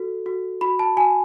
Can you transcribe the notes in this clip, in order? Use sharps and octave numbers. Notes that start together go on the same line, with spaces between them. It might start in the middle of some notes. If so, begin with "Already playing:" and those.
Already playing: F#4 A4
F#4
F#4 B5
A5
F#4 G#5